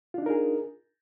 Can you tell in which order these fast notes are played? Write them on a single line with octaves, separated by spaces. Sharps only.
F4 D4 D#4 A#4 G#4